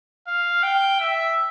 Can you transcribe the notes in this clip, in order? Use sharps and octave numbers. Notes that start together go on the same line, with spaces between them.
F5
G5
E5